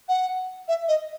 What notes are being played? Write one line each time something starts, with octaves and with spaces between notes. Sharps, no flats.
F#5
E5
D#5